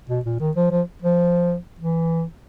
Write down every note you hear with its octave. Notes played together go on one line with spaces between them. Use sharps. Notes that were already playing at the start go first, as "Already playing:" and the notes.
B2
A#2
D#3
F3
F3
F3
E3